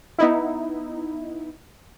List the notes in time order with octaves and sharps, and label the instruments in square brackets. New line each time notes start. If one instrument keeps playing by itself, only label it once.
[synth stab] B3 D#4 E4